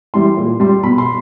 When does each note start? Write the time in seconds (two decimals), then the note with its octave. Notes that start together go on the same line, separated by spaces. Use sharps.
0.14 E3 G3 C6
0.37 A#2
0.60 G3 C6
0.83 B2 B5
0.98 C6